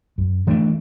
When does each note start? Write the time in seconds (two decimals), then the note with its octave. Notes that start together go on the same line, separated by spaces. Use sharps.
0.18 F#2
0.47 E3 A3 D4